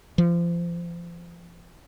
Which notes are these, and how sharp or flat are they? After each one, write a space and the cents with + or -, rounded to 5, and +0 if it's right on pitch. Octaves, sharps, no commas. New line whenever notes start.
F3 -30